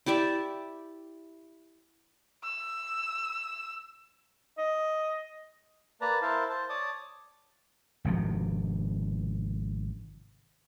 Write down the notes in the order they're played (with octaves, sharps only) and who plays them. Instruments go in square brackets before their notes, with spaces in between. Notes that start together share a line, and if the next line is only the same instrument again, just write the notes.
[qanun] E4 G4 D5 E5
[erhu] E6
[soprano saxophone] D#5
[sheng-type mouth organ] A#3 B4 D5 A5 A#5
E4 A#4 C5 F5 A5
C5 A5
C#5 D5 A5 D6 D#6
[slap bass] G#1 C3 F3